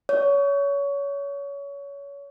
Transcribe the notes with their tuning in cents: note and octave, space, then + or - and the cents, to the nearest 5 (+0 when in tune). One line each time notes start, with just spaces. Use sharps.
C#5 +25